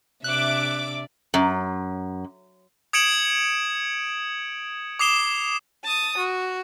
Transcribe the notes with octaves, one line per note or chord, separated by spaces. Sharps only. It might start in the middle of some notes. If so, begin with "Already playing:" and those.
C3 D4 D5 E5 D6 F#6
F#2
D#6 G#6 C#7 D7 E7 F#7
D6 D#6 C7 E7 G7
A5 D#6
F#4